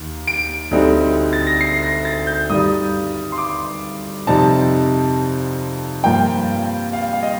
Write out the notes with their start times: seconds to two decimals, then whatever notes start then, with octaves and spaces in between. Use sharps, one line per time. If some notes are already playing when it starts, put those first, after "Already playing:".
Already playing: D#2 D#3
0.27 D7
0.71 D2 D3 G3 C4 D#4
1.33 A6
1.47 A#6
1.61 C7
1.83 A#6
2.05 A6
2.27 G6
2.50 G2 D#3 G3 D#6
3.32 C6
3.38 D6
4.27 F2 C3 G3 C4 D#4 A5
6.04 G2 F3 A#3 G5
6.93 F5
7.13 F5
7.23 D#5